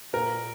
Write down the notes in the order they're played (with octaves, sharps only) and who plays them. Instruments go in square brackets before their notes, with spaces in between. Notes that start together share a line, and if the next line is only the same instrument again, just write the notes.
[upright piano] A#2 A#4